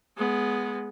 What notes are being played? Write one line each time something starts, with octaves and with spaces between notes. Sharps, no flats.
G#3 B3